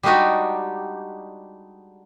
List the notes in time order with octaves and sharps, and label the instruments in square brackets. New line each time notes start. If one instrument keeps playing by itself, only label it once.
[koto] G3 G#3 D4 D#4 F#4 G4